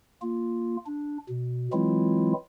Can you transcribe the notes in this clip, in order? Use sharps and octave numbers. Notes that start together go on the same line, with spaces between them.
A#3 F4
D4
B2
E3 F#3 G#3 C4 E4 F4